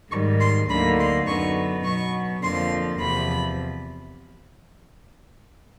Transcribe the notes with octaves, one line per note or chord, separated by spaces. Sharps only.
G#2 D#3 G3 C#6
C6
D2 D3 F#3 A#3 D#4 B5
C6
F#2 D3 F#3 B3 D#4 C#6
B2 F#3 B3 C#6
F2 D3 F3 A#3 C6
E2 C3 F3 B5